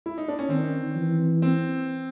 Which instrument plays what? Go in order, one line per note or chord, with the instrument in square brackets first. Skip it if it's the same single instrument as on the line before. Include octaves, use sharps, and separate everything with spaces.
[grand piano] E4
D#4
D4
C#4
[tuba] D#3 [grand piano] C4
[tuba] E3
[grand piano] C4